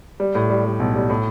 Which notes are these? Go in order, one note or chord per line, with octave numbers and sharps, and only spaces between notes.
G3
A2
G3
G3
B1
G3
A2